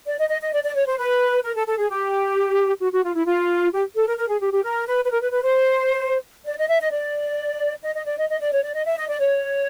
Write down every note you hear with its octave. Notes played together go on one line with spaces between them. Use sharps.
D5
D#5
D#5
D#5
D5
D5
C#5
C5
B4
A#4
A4
A4
G#4
G4
F#4
F#4
F4
E4
F4
G4
A4
A#4
A#4
G#4
G4
G4
A#4
B4
B4
A#4
B4
B4
C5
D5
D#5
E5
D#5
D5
D#5
D#5
D5
D#5
D#5
D5
C#5
D5
D#5
E5
D#5
D5
C#5